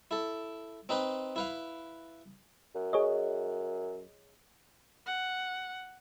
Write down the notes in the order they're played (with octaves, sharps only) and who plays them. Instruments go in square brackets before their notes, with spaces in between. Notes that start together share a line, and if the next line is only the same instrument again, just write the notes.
[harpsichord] E4 A4
C4 D#4 B4 C5
E4 B4 F5
[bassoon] F#2
[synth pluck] G#4 C#5 D#5
[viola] F#5